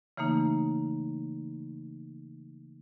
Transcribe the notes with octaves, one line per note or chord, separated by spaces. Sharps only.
C#3 E3 A3 A#3 D#4